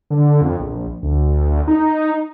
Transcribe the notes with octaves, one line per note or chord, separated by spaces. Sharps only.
D3
F2
A#1
D2
D#4